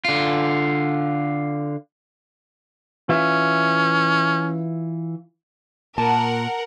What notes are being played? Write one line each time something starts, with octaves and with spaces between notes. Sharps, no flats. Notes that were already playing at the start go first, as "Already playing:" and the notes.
D3 F4
E3 C#4 F4 E5
A#2 A#4 F#5 A5